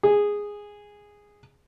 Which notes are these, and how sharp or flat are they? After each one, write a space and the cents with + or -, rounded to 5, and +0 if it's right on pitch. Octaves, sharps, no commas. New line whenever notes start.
G#4 -10